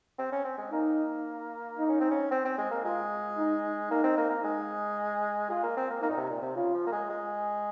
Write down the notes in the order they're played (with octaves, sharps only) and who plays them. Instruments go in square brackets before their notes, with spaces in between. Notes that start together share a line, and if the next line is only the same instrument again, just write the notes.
[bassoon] C4
C#4
C4
G#3
[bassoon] A#3 [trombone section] D#4
[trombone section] D#4
[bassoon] C#4
C4
C#4
C4
C4
G#3
A#3
[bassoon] G#3 [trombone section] F4
[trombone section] D#4
[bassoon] A#3 [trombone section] D#4
[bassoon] C4
A#3
A#3
G#3
[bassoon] G#3 [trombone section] F4
[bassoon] A#3
C4
A#3
[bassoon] A#3 [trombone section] D#4
[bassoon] A#2
C3
A#2
C3
[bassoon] C#3 [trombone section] F4
[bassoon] F3
A#3
G#3
G#3